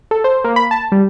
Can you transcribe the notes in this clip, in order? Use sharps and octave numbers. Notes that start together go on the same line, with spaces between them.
A4
C5
A#3
B5
A5
G3